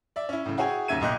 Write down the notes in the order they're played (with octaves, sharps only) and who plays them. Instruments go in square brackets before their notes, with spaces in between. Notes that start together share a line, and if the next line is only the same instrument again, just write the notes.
[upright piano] D5 E5
C#4 E4
A2 C#3
E4 F#4 G#4 C#5 G5 G#5
D#2 C#3 E5 G#6 D#7
B1 A#2 D#5 G5 F#6 G6